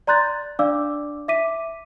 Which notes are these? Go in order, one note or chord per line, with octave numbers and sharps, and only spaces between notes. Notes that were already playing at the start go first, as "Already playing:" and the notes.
D5 A#5 C6 F#6 G6 A6
D4 D5 F5 D6 E6
E5 D6 B6 D#7